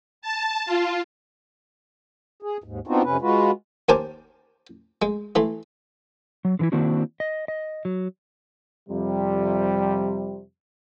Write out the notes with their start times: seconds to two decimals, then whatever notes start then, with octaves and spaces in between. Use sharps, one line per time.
0.22 A5
0.66 F4
2.42 G#4
2.64 D#2 G#2
2.87 B3 C4 D4 D#4 F4 F#4
3.04 F2 C3 C#4 B4
3.21 G#3 F4 F#4 B4
3.89 D#2 A#4 C5 G#5 A5 D6
5.02 G#3
5.35 E3 A3 C6
6.45 F#3
6.59 D3 E3 E4
6.72 D#3 A#3 C4 D4 E4 F#4
7.20 D#5
7.48 D#5
7.85 F#3
8.89 F2 C3 G3